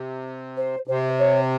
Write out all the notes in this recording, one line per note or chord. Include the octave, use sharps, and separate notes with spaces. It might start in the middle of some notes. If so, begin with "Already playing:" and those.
Already playing: C3
C5
C3 C5
C#5